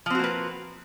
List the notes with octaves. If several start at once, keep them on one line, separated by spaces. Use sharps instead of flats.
F3 A#3 C4 F#4 B4